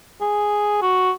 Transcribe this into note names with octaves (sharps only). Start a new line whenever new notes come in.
G#4
F#4